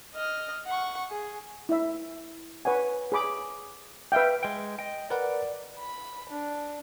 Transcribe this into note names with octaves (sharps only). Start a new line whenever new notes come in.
D#5 F6
F#5 C#6
G#4
E4 E5
B4 C#5 F#5 G#5
G#4 C#5 B5 D6
B4 E5 F5 G5
G#3 G5
D#5 G5
A#4 B4 D5 F#5
B5
D4